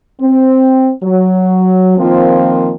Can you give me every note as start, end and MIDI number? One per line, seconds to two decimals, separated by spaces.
0.20 0.90 60
1.03 1.95 54
1.98 2.73 51
1.98 2.73 53
1.98 2.73 58
1.98 2.73 60
1.98 2.73 65